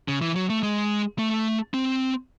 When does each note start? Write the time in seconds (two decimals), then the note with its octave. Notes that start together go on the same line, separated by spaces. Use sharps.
0.08 C#3
0.22 E3
0.36 F#3
0.50 A3
0.63 G#3
1.19 A3
1.74 C4